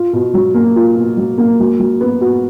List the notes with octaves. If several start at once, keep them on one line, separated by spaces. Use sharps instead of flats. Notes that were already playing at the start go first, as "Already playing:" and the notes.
Already playing: F4
B2
F#3
A#3
F4
B2
F#3
A#3
F#3
F#3
B3
F#4